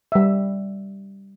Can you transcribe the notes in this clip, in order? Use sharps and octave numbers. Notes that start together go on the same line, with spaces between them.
G3 E5